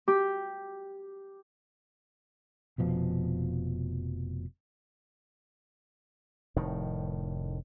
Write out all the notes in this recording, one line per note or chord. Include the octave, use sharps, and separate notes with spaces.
G4
F1 B2 F3
F1 A2 D#3